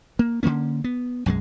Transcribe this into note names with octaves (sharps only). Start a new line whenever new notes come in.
A#3
D3 F#3 A#3 C#4
B3
B1 F#2 F3 G#3